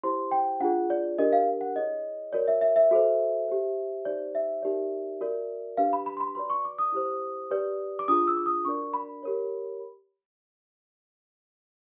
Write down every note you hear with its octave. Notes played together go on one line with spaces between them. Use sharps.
E4 G4 C5 C6
G5
D4 F4 G#4 F#5
D5
D4 G4 A#4 D#5
F5
F#5
E4 G#4 C#5 D#5
F#4 A#4 C#5 D5
E5
E5
E5
F#4 A4 C5
G4 C5
D#4 G4 C5 D5
E5
D#4 G4 A#4 D5
F#4 A#4 D5
D4 G4 B4 F5
B5
B5
C6
B5
F#4 B4 D5 C6
C#6
D6
D#6
E4 G4 C5
G4 B4 D5
D6
D4 F4 G#4 D#6
E6
D6
D#6
D4 F#4 A#4 D5 C#6
B5
G4 A#4 C#5